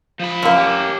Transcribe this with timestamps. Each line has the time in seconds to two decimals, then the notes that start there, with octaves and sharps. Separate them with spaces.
0.19 F3 B5
0.42 F#2 A#3
0.56 G4 C#5